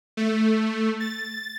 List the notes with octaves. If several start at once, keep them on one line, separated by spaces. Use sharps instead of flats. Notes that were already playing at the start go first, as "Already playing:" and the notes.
A3
A6